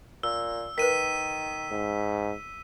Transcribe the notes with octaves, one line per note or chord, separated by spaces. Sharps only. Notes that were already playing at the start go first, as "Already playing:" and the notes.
A#2 E6
D#3 A#4 B4 B6 D#7
G#2